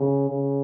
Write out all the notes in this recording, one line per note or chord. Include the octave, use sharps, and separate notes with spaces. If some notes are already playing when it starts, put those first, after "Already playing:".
Already playing: C#3
C#3